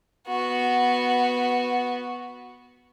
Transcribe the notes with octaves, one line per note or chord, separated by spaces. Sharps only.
B3 F#4